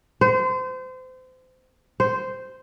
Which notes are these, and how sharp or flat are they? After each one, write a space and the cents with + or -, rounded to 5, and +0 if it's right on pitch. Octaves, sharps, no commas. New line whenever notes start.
C5 -30
C5 -10